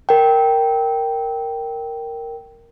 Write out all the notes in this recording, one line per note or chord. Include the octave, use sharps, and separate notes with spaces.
A#4 G5